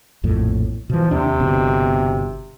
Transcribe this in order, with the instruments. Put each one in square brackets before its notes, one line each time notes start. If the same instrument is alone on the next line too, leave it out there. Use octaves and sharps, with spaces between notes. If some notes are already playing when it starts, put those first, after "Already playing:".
[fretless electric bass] A#1 F2 A2
[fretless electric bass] B2 E3 [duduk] F3
[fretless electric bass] D#2 D4 [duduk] C3
[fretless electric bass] G1 B2 D3